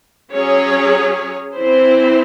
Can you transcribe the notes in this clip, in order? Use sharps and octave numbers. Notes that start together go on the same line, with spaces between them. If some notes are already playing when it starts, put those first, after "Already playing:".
F#3 C#4 G#4 C#5
E3 C4 E4 C5